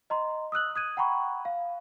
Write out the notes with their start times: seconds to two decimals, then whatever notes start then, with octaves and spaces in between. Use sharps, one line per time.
0.10 D#5 A#5 C6
0.52 D#6 E6 F#6 F#7
0.76 D#6 G#6 D#7
0.97 F#5 G5 A#5 B5 C#6
1.45 F5